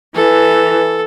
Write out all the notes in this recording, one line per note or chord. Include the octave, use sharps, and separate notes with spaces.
E3 A4